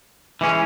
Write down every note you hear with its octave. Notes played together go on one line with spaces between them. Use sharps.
E3 G#3 C#4